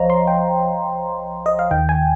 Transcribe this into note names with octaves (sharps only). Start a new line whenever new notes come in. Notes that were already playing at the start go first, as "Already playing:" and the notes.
Already playing: C2 F3 C5 C#5 D#5 F5 A#5
C6
G5
D#5
F5
D#2 D#3 G5
G#5